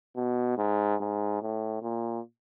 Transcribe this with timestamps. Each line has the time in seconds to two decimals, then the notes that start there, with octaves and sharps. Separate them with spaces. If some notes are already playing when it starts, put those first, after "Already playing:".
0.16 B2
0.58 G#2
1.00 G#2
1.42 A2
1.82 A#2